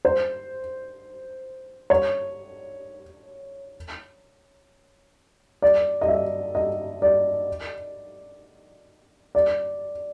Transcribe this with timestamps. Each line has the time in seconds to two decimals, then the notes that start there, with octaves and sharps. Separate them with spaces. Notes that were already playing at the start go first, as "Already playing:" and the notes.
0.05 C5
1.90 C#5
5.62 D5
6.01 D#5
6.08 E5
6.55 D#5
7.02 D5
9.35 D5